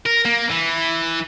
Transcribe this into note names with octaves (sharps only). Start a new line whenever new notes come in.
A#4
A#3
E3